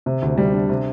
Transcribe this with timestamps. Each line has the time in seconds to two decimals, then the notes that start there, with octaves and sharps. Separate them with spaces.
0.06 C3
0.22 D2
0.38 G3
0.53 D4
0.69 C3